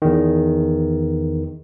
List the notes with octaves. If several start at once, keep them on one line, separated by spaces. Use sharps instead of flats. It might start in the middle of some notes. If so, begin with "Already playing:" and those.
E2 D#3